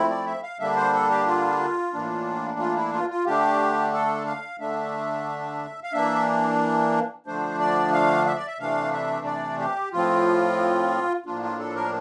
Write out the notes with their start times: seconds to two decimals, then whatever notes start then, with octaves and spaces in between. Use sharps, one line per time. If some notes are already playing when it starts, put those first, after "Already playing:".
Already playing: F3 A3 C4 E4
0.10 D5
0.26 E5
0.43 F5
0.59 D3 G3 A#3 D4 E5
0.76 C5
0.93 A4
1.10 G4
1.26 F4
1.93 A2 E3 A#3 D4
2.59 F4
2.76 E4
2.93 F4
3.10 F4
3.26 D3 A3 D4 G4
3.93 A4
4.26 F5
4.60 D3 A3 D4 E5
5.83 F5
5.93 E3 A#3 D4 E5
7.26 D3 F3 A3 D4 C5
7.60 D5
7.93 F5
8.27 E5
8.36 D5
8.47 E5
8.59 C3 E3 A3 D4 F5
8.93 E5
9.26 D5
9.59 G4
9.92 A2 F3 C4 F4
11.26 A2 F3 A#3 D4 F4
11.42 F4
11.59 A4
11.76 A#4